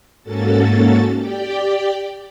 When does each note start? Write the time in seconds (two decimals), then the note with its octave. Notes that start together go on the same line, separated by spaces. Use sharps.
0.23 G#2 A#3 C#4 F#4 A4 A6
1.17 G4 D5 G5